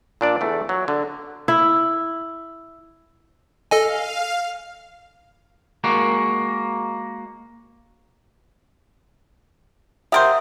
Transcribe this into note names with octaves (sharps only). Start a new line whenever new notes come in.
A#2 D4 D5
E2 A3
F#3
D3
E4
A4 D#5 F5 G#5
G#3 A#3 F#4
G4 A#4 C5 E5 F#5 D#6